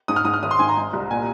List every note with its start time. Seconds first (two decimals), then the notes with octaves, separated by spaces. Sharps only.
0.08 G#2 D#6
0.16 F6
0.25 G#2 D#6
0.34 F6
0.43 G#1 D#6
0.51 C6
0.59 G#2 G#5
0.69 A#5
0.77 G#3
0.93 C2
1.11 A#2 G#5